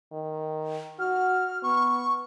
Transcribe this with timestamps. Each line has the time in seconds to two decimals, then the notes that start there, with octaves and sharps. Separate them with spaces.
0.12 D#3
1.00 F#4 F6
1.63 B3 C#6